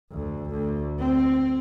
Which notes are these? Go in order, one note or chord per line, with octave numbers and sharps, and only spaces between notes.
D2
D2
C4